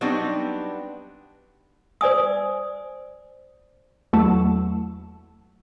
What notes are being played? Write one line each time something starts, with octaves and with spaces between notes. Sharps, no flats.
F#3 G3 B3 C4 D4 D#4
C5 D5 G#5 D#6
E2 F#3 A3